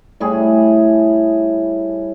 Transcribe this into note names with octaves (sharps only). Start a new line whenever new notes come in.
A2 G3 G#4